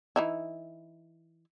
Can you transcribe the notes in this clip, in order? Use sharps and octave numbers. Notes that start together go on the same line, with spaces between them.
E3 D#4 E4